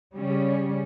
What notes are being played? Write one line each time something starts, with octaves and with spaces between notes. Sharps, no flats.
C#3 G3 C#4